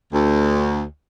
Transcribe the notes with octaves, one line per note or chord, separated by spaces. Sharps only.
D2